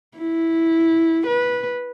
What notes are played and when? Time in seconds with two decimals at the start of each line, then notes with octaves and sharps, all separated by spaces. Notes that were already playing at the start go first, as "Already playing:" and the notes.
0.18 E4
1.27 B4